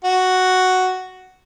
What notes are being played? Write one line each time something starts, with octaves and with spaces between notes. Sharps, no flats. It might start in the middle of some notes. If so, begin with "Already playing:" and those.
F#4